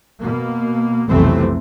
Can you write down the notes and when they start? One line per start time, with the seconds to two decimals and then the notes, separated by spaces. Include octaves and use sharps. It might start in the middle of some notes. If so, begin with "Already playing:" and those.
0.20 B2 A#3
1.09 B1 F2 C3 E3 A3 C4